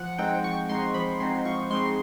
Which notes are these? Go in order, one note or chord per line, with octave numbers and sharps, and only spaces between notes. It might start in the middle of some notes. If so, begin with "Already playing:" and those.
Already playing: F3 F#5
G#3 C4 D#4 G5
F3 C#6
G#3 C4 D#4 C6
F3 B5
G#3 C4 D#4 C6
F3 C#6
G#3 C4 D#4 C6